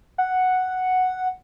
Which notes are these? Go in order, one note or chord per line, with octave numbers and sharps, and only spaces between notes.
F#5